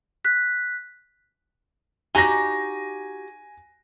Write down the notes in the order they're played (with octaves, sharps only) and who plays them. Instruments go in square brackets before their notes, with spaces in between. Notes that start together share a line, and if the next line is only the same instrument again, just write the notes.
[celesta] F#6 B6
[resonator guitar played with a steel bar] D#4 F#4 G4 [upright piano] G#5 A#6